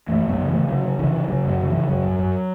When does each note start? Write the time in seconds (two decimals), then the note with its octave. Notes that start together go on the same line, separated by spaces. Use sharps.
0.08 F#2 E3 A3
0.24 F#2
0.29 F#3 B3
0.39 C#3
0.48 E3 A3
0.54 C#3
0.68 C#3 F#3
0.84 C#3
0.99 C#3 E3
1.13 C#3
1.28 C#3 F#3
1.43 F#2
1.49 F#3
1.59 C#3
1.69 C#3 E3
1.89 F#2 F#3
2.04 F#2
2.19 F#2